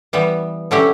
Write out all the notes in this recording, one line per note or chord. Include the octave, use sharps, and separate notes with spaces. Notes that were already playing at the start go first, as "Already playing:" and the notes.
E3 G3 B3
D3 F#3 C#4 E4 G4